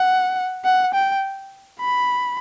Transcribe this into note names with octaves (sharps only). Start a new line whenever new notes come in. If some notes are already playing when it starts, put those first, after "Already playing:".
Already playing: F#5
F#5
G5
B5